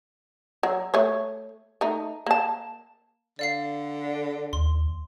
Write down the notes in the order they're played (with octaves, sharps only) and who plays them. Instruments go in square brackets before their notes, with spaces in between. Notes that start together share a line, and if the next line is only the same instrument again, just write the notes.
[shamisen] F#3
A3 C#5
A3 D#4
A#3 A5
[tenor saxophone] D3 [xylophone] D5 F5 C7
[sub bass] D#2 [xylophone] C6